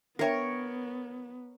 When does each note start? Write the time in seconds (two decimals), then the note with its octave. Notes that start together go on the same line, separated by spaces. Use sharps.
0.19 B3 D4 A#4 C#5 E5 G5